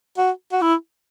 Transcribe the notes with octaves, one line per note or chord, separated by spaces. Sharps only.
F#4
F#4
E4